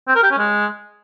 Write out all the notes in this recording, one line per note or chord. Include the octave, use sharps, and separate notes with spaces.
C4
A#4
G4
C#4
G#3